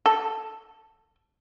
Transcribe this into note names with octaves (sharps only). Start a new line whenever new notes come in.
A4